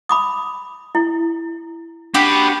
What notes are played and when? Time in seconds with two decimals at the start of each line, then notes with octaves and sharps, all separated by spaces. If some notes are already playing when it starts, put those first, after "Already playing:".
0.09 B5 D6 D#6
0.95 E4
2.14 A#3 D4 F#4 G4 B5